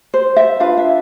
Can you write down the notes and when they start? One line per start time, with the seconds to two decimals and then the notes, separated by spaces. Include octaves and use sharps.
0.14 C5
0.37 E5
0.60 D4 F4 B4 F5
0.77 E5